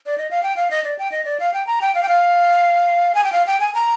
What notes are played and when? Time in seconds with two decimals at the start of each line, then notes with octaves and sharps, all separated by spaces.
0.06 D5
0.18 D#5
0.31 F5
0.43 G5
0.56 F5
0.71 D#5
0.84 D5
0.99 G5
1.12 D#5
1.25 D5
1.40 F5
1.54 G5
1.67 A#5
1.81 G5
1.95 F5
2.03 G5
2.08 F5
3.15 G#5
3.24 G5
3.32 F5
3.47 G5
3.60 G#5
3.75 A#5